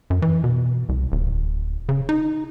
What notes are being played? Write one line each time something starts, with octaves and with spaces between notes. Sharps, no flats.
F#2
E3
B2
C2
D1
C#3
D#4